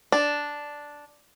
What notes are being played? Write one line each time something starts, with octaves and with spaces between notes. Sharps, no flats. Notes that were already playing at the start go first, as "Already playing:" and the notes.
D4